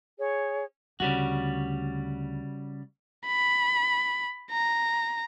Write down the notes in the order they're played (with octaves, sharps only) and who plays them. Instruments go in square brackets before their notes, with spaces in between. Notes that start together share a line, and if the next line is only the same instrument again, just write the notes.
[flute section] G#4 C#5
[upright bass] D2 [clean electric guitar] C#3 G3 F#4
[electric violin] B5
A#5